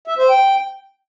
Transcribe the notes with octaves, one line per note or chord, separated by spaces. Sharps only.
E5
C5
G5